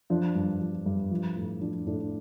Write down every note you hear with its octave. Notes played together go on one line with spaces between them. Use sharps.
F3 D4
G2
F3
G2
F3
A2
F3 D4
A2 D4